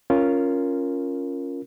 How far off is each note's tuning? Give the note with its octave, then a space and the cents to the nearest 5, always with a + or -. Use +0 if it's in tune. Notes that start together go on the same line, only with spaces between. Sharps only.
C#4 +0 F4 -10 A#4 +0